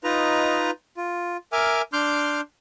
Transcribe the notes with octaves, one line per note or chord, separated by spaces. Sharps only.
D#4 F4 B4 D#5 A#5
F4
A#4 E5 G#5 D6 F6
D4 C6 D6 F6 G6